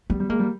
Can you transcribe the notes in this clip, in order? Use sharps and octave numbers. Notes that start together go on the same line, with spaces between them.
G3 B3
G3
G#3 A#3
G3